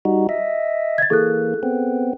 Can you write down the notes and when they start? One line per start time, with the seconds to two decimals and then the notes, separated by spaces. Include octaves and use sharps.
0.05 G3 D#4 F#4
0.29 D#5 E5
0.98 G#6 A6
1.10 E3 A#3 G#4 A4 F#6
1.63 B3 C4